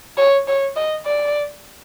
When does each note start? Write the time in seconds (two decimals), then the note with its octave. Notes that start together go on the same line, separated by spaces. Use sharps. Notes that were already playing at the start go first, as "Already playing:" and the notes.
0.17 C#5
0.47 C#5
0.76 D#5
1.06 D5